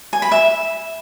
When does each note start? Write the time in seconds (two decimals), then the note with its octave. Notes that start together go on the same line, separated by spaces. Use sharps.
0.13 G#5
0.22 B5
0.32 E5